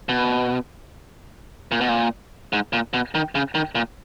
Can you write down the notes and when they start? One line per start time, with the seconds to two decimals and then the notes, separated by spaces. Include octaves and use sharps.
0.09 B2
1.72 A#2
1.81 B2
1.89 A#2
2.53 G#2
2.73 A#2
2.94 B2
3.15 D#3
3.35 C#3
3.55 D#3
3.75 A#2